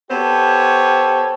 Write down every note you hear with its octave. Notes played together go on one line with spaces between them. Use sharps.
B3 G4 A4 C5 C#5